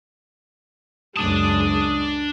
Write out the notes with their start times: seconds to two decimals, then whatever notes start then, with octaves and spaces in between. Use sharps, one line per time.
1.16 C#2 F#2 G#3 D4 A5 D#6